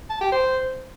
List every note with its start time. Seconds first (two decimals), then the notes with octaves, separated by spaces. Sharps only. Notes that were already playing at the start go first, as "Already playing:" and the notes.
0.10 A5
0.21 G4
0.32 C5